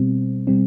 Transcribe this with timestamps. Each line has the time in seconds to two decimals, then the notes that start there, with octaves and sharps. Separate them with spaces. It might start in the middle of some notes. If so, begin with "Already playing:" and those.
Already playing: B2 G3 C4
0.47 B2 G3 C4